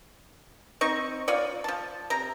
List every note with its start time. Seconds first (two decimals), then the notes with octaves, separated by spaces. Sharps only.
0.81 C4 D#4 C#6
1.28 F4 C#5 D5
1.64 F3 A5
2.10 C3 A#5